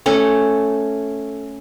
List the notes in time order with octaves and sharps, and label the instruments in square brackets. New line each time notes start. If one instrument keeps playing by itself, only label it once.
[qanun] A3 C#4 A4 C#5